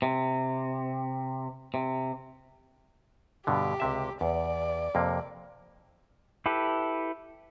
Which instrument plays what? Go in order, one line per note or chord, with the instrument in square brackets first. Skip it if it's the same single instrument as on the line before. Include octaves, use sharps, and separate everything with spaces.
[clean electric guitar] C3
C3
[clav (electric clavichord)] G2 B2 D3 [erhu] G4
[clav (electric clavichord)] C#2 C3 E5
[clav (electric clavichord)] E2 [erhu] D5
[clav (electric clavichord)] F2 C3 A#3
[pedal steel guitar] E4 G4 A4 B4